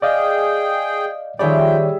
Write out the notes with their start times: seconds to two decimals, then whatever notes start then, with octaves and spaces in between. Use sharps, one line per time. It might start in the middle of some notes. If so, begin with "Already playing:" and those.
0.02 G#4 D5 D#5 F5 G5
1.39 D#3 F3 G3 G#4 C#5 D5 E5 G5